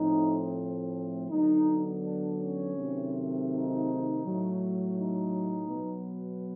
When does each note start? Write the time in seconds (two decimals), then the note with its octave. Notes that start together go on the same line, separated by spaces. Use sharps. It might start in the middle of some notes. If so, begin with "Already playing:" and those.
Already playing: A2 F3 A3 C4 D#4
1.30 D3 F#3 B3 D#4
2.03 D4
2.39 C#4
2.76 C3 D#3 F#3 A3 C4
3.50 D#4
4.22 A2 F#3 A3
4.96 D#4
5.69 B2 F#3 B3